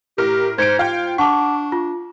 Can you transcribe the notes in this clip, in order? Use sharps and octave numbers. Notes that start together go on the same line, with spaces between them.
A2 G4 A#4 F6
G#2 C5 G#6 C#7 D7
F4 F5 G5
D4 F#5 A5 C#6 D6
F4